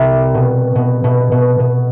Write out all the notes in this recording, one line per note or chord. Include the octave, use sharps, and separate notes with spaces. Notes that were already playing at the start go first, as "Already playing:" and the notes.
Already playing: C2 C3
B2
B2
B2
B2
B2